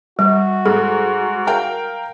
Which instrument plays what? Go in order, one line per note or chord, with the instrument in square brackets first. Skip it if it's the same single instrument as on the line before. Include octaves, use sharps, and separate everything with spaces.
[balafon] G3 [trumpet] F#4
[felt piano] G#2 [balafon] A4
[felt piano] A#4 F5 G5